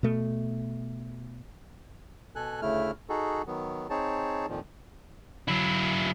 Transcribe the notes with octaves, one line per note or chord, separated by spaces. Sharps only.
B2 A3
B2 A4 G#5 F#6
D2 C#3 A3 E4 F6
D#4 F#4 G#4 A4
D#3 F#3 B3
C4 D#4 G#4 C#5 A5
F2 A#2 D#3 F3
F#3 E4